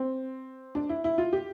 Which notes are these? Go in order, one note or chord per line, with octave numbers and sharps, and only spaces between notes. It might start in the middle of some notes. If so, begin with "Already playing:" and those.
Already playing: C4
D4
E4
E4
F4
G4